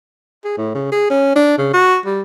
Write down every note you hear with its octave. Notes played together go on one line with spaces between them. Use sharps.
G#4
A2
C#3
G#4
C#4
D4
C#3
F#4
G3